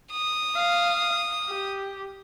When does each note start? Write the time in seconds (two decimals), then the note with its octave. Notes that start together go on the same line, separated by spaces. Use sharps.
0.13 D#6
0.56 F5
1.49 G4